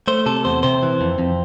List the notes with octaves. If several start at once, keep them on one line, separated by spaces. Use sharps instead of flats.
A3 C5
C3 A4
E2 C5
C3 C5
E3
F2
F2